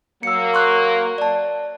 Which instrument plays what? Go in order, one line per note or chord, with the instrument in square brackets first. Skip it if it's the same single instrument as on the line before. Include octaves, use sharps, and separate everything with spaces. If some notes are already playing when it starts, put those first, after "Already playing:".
[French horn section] F#3 A#3 [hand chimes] E6 C#7
[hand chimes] C6 C#6 F#6
D5 A5